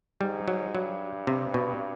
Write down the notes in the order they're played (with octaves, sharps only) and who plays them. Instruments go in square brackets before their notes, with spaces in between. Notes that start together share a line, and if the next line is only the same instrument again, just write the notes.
[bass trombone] G#2 [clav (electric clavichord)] G3
[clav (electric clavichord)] F#3
[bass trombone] G2 [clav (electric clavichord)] F#3
[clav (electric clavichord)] C3
B2